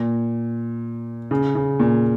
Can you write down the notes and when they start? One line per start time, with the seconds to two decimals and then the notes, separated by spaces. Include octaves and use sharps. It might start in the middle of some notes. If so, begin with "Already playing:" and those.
Already playing: A#2
1.31 C#3
1.55 C#3
1.80 A#2